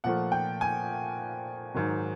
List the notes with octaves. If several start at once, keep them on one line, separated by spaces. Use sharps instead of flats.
A#2 F3 A3 F#5
G5
G#5
G#2 D#3 F#3